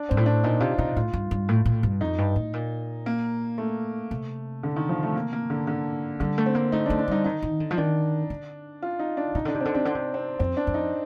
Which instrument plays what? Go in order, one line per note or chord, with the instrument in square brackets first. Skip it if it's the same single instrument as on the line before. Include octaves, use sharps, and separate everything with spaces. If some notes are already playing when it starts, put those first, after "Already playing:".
Already playing: [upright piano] D4
[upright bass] G2 [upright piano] C4
[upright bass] A2
[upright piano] D4
[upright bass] A#2 [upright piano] D#4
[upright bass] C3 [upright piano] F4
[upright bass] C3 [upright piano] D#4
[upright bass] A2 [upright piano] F4
[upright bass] G2
G2
A2
A2
G2
[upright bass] F2 [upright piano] D#4
[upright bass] G2
A2
A#2
[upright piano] A#3
A3
[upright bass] C3
[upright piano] D3
D#3
F3
A3
A#3
A#3
D3
D3
[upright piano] D3 [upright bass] G3
[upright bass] A3
[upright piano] C4
[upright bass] A#3
[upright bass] A3 [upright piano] D#4
[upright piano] D4
[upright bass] A3
[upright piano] D4
[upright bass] G3 [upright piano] D#4
[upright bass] D#3 [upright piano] D#4
[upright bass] D#3
D3
F3
[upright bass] D#3 [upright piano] D4
[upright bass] D3
[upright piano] F4
D#4
D4
[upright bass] C3 [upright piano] D#4
[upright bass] D3 [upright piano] D4
[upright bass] C3
[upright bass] D3 [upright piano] C4
[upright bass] C3 [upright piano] D4
[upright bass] D3 [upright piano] D4
[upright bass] C3
[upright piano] C4
[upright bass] F2 [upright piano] C4
[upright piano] D4
[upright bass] F2
[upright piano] D#4